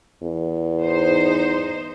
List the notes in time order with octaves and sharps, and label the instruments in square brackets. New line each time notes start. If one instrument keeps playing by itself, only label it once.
[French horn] E2
[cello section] D#4 C5